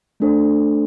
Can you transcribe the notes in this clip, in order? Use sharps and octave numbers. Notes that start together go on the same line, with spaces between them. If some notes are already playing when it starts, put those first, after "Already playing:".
A3 D4 A4 C5